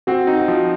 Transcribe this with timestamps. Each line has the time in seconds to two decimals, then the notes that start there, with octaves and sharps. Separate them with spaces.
0.07 C4 F#4
0.27 D#4
0.38 F#4
0.48 F3